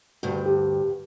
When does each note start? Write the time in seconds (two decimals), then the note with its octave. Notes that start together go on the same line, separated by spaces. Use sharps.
0.23 D2 G2 F#4
0.46 G4